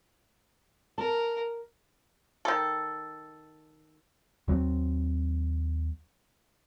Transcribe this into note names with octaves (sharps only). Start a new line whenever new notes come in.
A#4 A5
D#3 A4
D#2 F#3 B3 C4